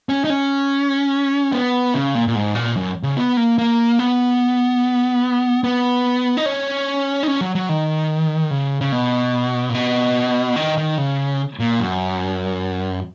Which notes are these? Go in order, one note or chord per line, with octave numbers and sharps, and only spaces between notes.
C#4
D#4
C#4
B3
C#3
A#2
A#2
G#2
A#2
F#2
C#3
B3
A#3
A#3
B3
B3
D#4
C#4
D#4
C#4
F#3
F#3
D#3
C#3
C#3
B2
A#2
B2
D#3
D#3
C#3
A#2
F#2